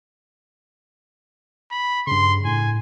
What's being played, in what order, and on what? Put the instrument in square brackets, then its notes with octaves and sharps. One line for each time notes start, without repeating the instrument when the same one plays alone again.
[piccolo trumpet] B5
[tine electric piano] G2 C#3 [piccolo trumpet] C6
[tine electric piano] A2 [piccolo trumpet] G#5